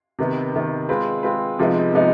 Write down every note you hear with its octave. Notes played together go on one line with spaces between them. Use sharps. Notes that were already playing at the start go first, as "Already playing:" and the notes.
C3 D#3 B3
C3 D#3 B3
G#3 C4 F4 B4
G#3 C4 F4 B4
C3 F3 G#3 B3 D#4
C3 F3 G#3 B3 D#4